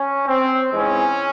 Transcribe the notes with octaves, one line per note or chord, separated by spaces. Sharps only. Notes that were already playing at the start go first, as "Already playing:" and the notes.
Already playing: C#4
C4
G#2 E3 G#3 C4 C#4